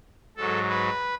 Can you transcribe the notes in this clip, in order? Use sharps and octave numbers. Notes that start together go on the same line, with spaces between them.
G#2 F#3 A4
B4